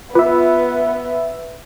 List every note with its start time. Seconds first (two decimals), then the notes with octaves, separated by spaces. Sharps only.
0.15 B3 F4 B4 E5